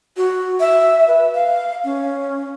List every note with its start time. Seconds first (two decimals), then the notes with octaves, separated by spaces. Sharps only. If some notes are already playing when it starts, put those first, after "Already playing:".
0.17 F#4
0.60 E5
1.08 B4
1.34 F5
1.84 C#4